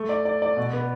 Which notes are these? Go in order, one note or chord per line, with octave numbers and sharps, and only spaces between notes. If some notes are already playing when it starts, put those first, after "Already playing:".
Already playing: A3
D5
D5
D5
B2
B3